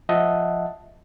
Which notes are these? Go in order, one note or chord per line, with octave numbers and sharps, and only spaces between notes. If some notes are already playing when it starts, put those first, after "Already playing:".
F3 D#5 E5 F#5 A5